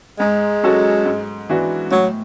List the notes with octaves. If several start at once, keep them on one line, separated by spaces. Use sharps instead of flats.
G#2 G#3
F#3 C#4 F#4 A4
G#2
E3 B3 D4 F#4
A2 F#3